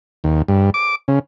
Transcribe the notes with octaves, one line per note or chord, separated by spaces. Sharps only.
D#2
G2
D6
C#3